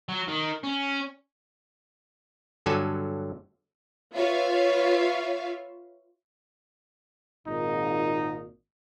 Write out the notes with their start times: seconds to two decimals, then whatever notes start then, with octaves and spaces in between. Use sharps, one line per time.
0.09 F#3
0.28 D#3
0.63 C#4
2.66 G2 D3 F#3 A4 G#5
4.15 F4 B4 C#5 E5 F5
7.47 G#1 A#2 D#4